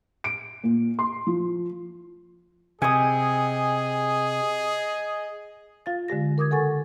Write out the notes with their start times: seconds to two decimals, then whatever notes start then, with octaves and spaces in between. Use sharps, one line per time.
0.24 D7
0.64 A#2
0.99 C6
1.27 F3
2.82 C3 G#4 D#5 G#5 D#6
5.86 F4 F5 A6
6.08 D3 G#3 G4 A#6
6.38 A#4 D6 D#6 G#6
6.51 C#3 A4 F#5 G#5 C#6 A6